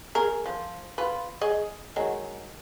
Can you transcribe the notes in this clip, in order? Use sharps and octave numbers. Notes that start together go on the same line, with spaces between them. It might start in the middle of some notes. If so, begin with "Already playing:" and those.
G#4 A#4
F3
F4 B4
G#4 D#5
D#3 F#3 G#3